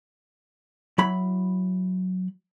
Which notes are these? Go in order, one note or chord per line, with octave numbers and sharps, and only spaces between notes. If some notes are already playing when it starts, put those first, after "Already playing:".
F#3 E4 B5